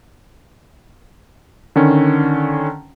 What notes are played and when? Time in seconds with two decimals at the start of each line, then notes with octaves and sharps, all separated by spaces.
1.76 D3 D#3 C#4